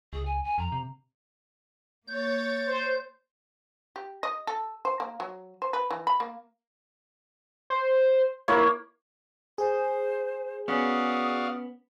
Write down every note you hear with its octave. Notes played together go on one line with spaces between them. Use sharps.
C#2 G#4
G#5
G#5
F2 A#5
C3
A#3 C#5 G6 A6
C5
G4
D#5
A4
C5
A#3
F#3
C5
B4
E3
B5
A#3
C5
A#3 E4 C#5
G#4 C5
B3 C#4 F#4 D5 F5 D#6